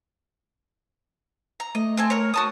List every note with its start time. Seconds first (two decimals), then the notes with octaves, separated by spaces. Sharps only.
1.60 A#5
1.75 A3 D#5
1.97 C4 A4 G#5
2.10 A#4 C#5
2.34 F#4 A5 C#6 D#6